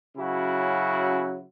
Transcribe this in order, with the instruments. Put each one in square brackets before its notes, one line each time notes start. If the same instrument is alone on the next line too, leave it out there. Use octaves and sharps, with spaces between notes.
[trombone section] C#3 F#3 C#4 E4 F#4